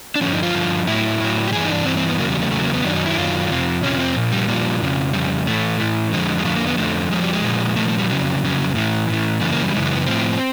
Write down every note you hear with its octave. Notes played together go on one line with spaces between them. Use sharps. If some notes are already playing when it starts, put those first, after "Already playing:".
D4
G2 D3 F3 C#4
D#4
F4
G2 D3 F3
A2 F#3 E4
A2 F#3
G4
G2 E3 G#4
D#4
D4
G2 E3 C4
C4
B3
E2 C#3 F#3 A#3
G3
A3
E2 C#3 F#3 A3
A#3
B3
F#2 D#3 F#3 D4
D#4
E4
F#2 D#3 F#3 F4
F2 C3 F3
F2 C3 F3 C#4
C4
A#2 F3
G3
A#2 F3 G3
F2 C#3 F3
F2 C#3 G3
A2 E3 A3
A2 E3
F2 D3 F3 G#3
G#3
F2 D3 F3 A3
A#3
B3
F2 D3 F3 A3
F2 D3 F3 G#3
G3
G#3
A#2 F3
A#2 F3 A3
A3
G3
F2 C#3 F#3
F2 C#3 F#3
A2 E3
A2 E3
F#2 C#3 E3 A3
A#3
G3
F#2 C#3 E3 G#3
G#3
B3
A2 F3 C4